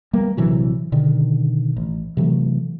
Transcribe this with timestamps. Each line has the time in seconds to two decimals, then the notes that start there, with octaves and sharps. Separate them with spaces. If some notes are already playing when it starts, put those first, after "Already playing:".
0.13 G3 A#3 B3
0.37 A#1 C3 E3 F#3
0.92 B2 D3 D#3
1.77 A1
2.17 C3 E3 F#3 A3